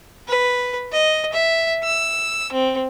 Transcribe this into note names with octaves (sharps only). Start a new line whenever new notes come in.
B4
D#5
E5
E6
C4